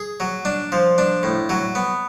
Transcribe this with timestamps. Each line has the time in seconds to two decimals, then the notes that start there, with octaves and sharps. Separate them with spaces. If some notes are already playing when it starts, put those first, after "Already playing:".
Already playing: G#4
0.20 F#3
0.45 D4
0.72 F3
0.98 D4
1.23 A2
1.49 F#3
1.75 B3